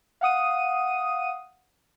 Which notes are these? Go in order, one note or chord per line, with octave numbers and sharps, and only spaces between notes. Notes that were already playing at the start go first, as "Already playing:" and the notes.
F5 F#5 D#6 D#7